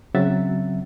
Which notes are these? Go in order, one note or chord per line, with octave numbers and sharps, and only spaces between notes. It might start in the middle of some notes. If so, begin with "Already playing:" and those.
C#3 F#3 C4 E5 F#5 A6